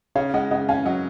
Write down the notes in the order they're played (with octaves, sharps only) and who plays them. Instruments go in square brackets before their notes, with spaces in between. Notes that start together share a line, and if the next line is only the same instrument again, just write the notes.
[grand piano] C#3 [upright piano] C#5 F5
[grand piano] G#3 [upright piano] D#5 F#5
[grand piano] C#3 [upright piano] D#5 F#5
[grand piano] C#4 [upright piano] F5 G#5
[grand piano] F#3 [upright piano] D#5 F#5